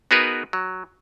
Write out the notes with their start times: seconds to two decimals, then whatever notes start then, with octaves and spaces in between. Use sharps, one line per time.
0.11 B3 D#4 F#4 G#4 A#4 B4
0.53 F#3